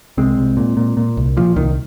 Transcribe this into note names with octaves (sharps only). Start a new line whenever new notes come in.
C2 G#3 C4
C2
A#2
A#2
A#2
C2
A#2 F3
C2 D#3